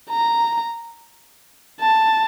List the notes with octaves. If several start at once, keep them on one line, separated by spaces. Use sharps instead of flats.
A#5
A5